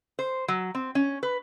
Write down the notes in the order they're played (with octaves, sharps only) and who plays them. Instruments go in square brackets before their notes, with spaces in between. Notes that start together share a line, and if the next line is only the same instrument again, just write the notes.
[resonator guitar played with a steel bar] C5
F#3
C4
C#4
B4